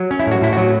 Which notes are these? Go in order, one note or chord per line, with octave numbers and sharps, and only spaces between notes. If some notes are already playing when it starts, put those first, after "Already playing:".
Already playing: F#3
C#4
E4
A2 F#4
A2 E4
F#3 F#4